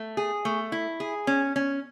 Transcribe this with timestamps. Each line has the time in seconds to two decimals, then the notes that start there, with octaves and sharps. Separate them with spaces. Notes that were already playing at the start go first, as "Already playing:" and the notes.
Already playing: A3
0.17 G#4
0.45 A3
0.72 E4
1.00 G#4
1.27 C#4
1.56 C#4